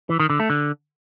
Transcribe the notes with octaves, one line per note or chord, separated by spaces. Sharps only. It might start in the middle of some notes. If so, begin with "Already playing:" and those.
E3
D#3
D3
A3
D3